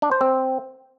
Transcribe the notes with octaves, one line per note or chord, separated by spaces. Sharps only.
D4
C5
C4